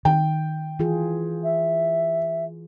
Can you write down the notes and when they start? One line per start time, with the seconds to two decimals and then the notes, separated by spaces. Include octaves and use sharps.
0.05 D#3 G5
0.79 E3 F4 G#4
1.43 E5